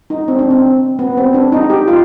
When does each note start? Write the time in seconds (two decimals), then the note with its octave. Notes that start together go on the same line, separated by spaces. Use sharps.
0.10 D#4
0.28 C4
0.39 D4
0.50 C4
0.99 B3
1.17 C4
1.34 D4
1.52 D#4
1.70 G4
1.88 F4